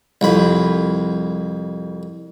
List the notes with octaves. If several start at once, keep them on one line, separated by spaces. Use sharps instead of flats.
C2 F2 B5